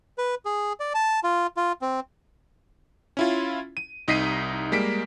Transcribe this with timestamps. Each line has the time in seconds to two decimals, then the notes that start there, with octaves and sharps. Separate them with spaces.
0.18 B4
0.45 G#4
0.80 D5
0.94 A5
1.24 F4
1.57 F4
1.82 C4
3.17 C#4 E4 F4
3.77 D#7
4.08 C2 D#4 D#5 B6 C7 D#7
4.72 G3 G#3 A#3 B6 D7